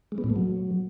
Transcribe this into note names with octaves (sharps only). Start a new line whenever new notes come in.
G#3
B3
A2
A3
F#3